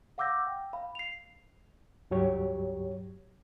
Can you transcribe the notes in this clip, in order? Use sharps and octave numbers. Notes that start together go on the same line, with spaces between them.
F5 F#5 D6 E6 G6 A#6
G5
F5 B5
C7 F7
C#2 G2 F#3 G4 C#5